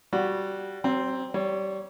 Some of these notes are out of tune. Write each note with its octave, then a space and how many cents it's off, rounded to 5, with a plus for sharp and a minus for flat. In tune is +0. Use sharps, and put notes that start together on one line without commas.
G3 -15 F#4 -10
F#3 +40 C4 +0
G3 -20 C#5 +0